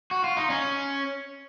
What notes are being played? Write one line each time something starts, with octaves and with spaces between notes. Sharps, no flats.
F#4
F4
D#4
C#4